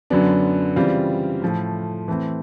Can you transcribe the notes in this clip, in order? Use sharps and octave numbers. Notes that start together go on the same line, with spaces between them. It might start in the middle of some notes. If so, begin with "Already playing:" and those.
F#2 D3 F#3 B3 D4
C#3 E3 G3 C4 F4
A2 F3 A3
E3 A3 C4